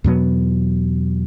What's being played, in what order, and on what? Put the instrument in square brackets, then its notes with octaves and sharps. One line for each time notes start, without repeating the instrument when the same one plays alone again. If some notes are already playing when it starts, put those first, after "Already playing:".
[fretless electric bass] E2 B2 F#3 B3